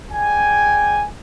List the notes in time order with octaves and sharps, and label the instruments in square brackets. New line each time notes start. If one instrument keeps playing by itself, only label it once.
[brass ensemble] G#4 D5 G5 G#5